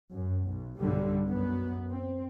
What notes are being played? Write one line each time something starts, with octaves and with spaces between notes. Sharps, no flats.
F#2
B1
B1 G2 D3 G3
F#2 B3
C4